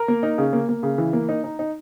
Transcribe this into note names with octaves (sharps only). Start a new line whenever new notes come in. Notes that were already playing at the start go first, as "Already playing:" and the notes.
Already playing: A#4
A#3
D#4
C#3
A#3
A#3
C#3
E3
A#3
D#4
D#4
D#4